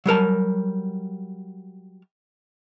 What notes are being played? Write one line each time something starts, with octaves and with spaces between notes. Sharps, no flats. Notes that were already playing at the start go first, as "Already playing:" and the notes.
F#3 G3 A#4 A5